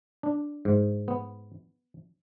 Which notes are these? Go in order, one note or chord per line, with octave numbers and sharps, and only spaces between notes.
D4
G#2
B3